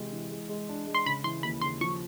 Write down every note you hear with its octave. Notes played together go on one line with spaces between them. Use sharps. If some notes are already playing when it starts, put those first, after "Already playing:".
Already playing: C3 E3 G#3
E3
G#3
G#3
D4
G#3
C6
C#3 B5
E3 C6
D#2 B5
C#3 C6
F3 C#6